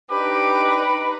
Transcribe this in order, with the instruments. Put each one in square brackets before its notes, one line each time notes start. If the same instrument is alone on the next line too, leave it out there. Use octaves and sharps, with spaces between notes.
[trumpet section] D4 G4 D6 [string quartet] D#4 B4